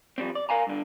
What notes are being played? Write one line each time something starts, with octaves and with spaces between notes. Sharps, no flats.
F3 G3 C4
D5
A#4 F5 G#5 A#5
G2 D3